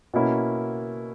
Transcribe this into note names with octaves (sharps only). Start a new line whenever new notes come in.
B2 A#3 C#4 E4